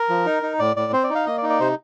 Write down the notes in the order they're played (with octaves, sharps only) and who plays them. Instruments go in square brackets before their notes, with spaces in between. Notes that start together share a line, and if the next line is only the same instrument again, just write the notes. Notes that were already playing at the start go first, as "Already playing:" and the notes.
Already playing: [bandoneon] A#4
F3
D#4
D#4
A2 D5
A2 D5
C4 C5
D5
D#4
F5
A#3 D#5
D5
D#4
D5
C3 C5